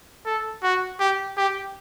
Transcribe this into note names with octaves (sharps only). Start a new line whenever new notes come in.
A4
F#4
G4
G4